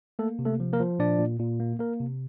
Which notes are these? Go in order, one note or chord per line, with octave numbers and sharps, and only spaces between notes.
A3 A#3 A4
C3
A3 A4
F3
A#3 A#4
F3
A#2 D4 D5
A#2
A#2
A#3
A#3 A#4
C3